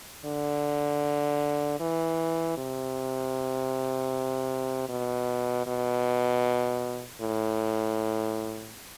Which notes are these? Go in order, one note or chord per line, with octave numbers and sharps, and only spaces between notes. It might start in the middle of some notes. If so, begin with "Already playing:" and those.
D3
E3
C3
B2
B2
A2